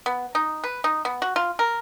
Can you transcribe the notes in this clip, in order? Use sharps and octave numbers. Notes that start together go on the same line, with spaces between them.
B3
D#4
B4
D#4
B3
F#4
F4
A#4